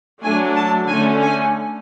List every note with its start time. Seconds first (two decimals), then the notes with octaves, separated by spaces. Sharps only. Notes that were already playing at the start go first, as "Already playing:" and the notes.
0.22 F#3 A3 D4 G#5
0.56 A5
0.88 D3 A3 C#4 G#5
1.22 G#5